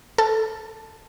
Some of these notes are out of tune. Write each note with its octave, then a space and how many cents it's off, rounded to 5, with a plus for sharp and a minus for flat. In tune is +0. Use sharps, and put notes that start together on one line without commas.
A4 +0 A5 +0